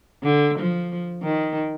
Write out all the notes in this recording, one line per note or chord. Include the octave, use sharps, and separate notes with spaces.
D3
F3
D#3